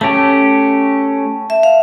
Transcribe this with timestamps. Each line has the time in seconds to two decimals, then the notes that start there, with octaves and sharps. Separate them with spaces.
0.01 A3 C#4 G4 A5
1.50 E5
1.63 F5